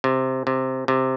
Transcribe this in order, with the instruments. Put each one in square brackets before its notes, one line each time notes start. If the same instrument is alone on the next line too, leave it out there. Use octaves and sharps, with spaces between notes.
[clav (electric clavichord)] C3
C3
C3